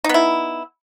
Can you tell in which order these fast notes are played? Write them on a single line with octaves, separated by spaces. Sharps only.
D#4 B3 E4